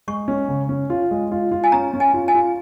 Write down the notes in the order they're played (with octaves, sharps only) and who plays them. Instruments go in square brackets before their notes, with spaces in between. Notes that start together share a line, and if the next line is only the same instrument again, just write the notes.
[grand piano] G#3 [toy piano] C#6
[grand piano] C#4
C#3
C#4
F4
G#3
F4
F4
[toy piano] G#5
[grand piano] C#4 [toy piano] A#5
[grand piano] C#4
[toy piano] G#5
[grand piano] F4
[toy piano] G#5
[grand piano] F4